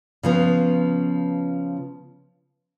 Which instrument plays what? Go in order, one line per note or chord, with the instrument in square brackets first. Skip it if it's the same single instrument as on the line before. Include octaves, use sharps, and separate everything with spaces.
[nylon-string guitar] C#3 F3 B3